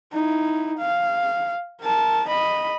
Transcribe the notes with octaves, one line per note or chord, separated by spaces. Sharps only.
D#4 E4
F5
A#4 A5
D#5 B5